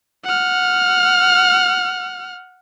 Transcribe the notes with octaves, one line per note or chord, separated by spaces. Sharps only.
F#5 F6